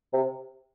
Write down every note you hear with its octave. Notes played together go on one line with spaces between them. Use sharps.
C3